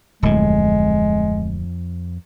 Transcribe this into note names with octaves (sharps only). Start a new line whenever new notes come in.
D1 F2 A2 G#3